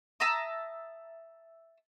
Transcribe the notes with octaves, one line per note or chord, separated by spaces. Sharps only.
E5 A5 A#5 D#6